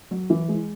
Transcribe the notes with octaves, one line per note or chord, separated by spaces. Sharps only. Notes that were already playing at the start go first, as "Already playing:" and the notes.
F#3
E3
G#3